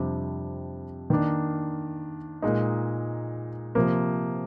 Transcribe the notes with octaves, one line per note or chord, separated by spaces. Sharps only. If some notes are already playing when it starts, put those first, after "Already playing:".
Already playing: F2 C3 G3 D4
D#3 A#3 D4
A#2 G#3 D#4
C3 F3 A#3